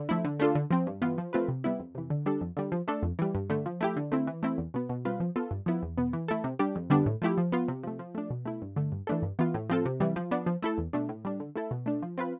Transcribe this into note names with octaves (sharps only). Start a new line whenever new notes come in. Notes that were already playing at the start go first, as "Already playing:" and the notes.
Already playing: D3
F3 A3 E4
D3
A3 D4 F4 A4
D3
F3 C4
G2
E3 B3 F4
F3
A3 C4 F4 B4
C3
G3 B3 E4
F2
C3 E3
D3
G3 D4 A4
F2
D3 G3
F3
A3 D4 A4
F2
E3 G3
G2
D3 A3
F3
A3 E4 G4
D3
A3 C4 E4
E3
A3 C4 E4
E2
B2 B3
B2
G3 C4 F4 B4
F3
B3 F4 A4
G2
F3 B3 E4
E2
B2 B3
E3
A3 E4 A4
C3
G3 D4 G4
F2
D3 G3 B3 D4
A2
F3 A3 E4 G4
F3
B3 F4
C3
F3 A3
F3
A3 D4
B2
A3 E4
G2
D3 A3
G2
E3 A3 D4 A4
G2
E3 B3 F4
A2
F3 C4 F4 A4
C3
E3 G3
F3
B3 D4
F3
A3 E4 A4
E2
B2 A3 D4
A2
G3 D4
D3
A3 E4 A4
B2
A3 D4
F3
C4 F4 B4